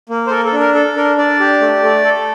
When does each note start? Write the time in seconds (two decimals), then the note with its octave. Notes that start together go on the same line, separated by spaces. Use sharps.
0.09 A#3
0.27 C5
0.30 A4 A#4
0.45 A4
0.53 D4
0.60 A#4
0.74 A4
0.96 D4 A#4
1.18 D4 D5
1.40 G4
1.61 A3
1.83 A3
2.05 A4